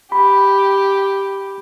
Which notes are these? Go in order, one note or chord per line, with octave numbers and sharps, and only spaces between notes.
G4 B5